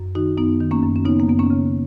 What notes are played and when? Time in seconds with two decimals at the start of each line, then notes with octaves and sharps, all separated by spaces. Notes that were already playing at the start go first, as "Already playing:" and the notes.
Already playing: F#2
0.15 D#3 D#4 F#4
0.38 F#2 B3 D#4
0.60 D#3
0.71 A#3 C#4
0.83 F#2
0.96 C#4
1.05 C#3 B3 D#4
1.19 A#3
1.28 F#2 B3
1.39 A#3 C#4
1.50 C#3